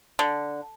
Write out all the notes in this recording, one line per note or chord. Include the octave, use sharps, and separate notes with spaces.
D3